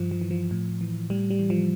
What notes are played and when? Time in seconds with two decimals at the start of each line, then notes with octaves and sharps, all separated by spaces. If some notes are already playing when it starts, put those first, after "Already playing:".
Already playing: G2 F3
0.11 F3
0.22 E3
0.31 F3
0.51 A2
0.81 E3
1.10 A2 G3
1.30 G3
1.39 E3
1.50 F3